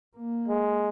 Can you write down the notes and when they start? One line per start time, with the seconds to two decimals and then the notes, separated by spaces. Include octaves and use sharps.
0.17 A#3
0.48 G#3